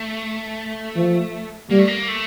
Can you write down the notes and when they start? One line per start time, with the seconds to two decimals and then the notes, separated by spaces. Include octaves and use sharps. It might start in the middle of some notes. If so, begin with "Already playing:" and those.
Already playing: A3
0.96 F3
1.70 G3 A#3
1.79 A3
1.87 A#3
2.08 A3